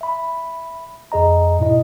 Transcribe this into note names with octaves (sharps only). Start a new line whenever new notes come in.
E5 B5
F2 G#4 D#5 A#5
G#2 B2 E4 D#5